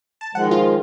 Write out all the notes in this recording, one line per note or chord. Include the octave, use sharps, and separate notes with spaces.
A5
D#3 F3 G#3 F#5
F4